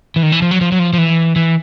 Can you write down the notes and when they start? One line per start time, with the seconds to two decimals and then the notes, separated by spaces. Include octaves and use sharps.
0.16 E3
0.23 D#3
0.32 E3
0.42 F3
0.51 F#3
0.61 F3
0.72 F#3
0.79 F3
0.93 F3
0.98 E3
1.36 E3